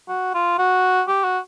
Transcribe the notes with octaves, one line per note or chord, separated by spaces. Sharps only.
F#4
F4
F#4
G4
F#4